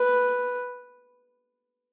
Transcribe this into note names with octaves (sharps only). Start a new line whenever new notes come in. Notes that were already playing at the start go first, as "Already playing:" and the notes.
Already playing: B4